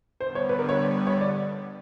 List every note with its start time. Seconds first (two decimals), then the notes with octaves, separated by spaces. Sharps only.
0.20 D3 C5
0.23 G3 B3
0.35 C#5
0.49 B4
0.59 A#4
0.69 C#5
1.07 C#5
1.21 D5